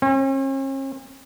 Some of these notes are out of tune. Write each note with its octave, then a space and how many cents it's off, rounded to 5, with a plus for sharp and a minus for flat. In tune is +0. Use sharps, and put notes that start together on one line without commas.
C#4 -45